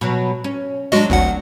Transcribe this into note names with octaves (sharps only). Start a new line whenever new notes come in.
B2 F#3
C#4
F#3 G#3 D4 F#4 D#5
G#1 D2 F#5